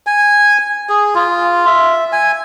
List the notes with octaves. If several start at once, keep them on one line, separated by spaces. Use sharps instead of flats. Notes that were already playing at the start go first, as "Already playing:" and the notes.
G#5
G#4
F4
E5
G#5